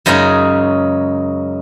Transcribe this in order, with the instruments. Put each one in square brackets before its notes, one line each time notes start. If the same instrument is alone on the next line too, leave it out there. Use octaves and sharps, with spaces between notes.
[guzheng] F#2 C#3 G#3 C#4 D#4 D#5